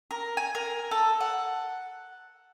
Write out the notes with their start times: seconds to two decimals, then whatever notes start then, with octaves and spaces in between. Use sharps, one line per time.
0.11 A#4
0.37 G#5
0.55 A#4
0.91 A4
1.21 F#5